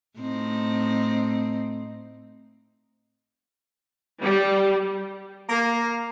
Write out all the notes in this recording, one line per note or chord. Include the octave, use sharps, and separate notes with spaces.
A2 C4 D#4
G3
A#3